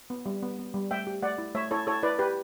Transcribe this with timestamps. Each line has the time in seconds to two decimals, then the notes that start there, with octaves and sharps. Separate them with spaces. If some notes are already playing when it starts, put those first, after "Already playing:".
0.10 B3
0.26 G3
0.42 B3
0.59 B3
0.74 G3
0.91 A3 E5 G5
1.07 G4
1.23 A3 D5 F#5
1.38 E4
1.55 A3 C#5 E5
1.71 E4 A4 C#5
1.87 E4 A4 C#5
2.03 E4 B4 D5
2.19 G4 B4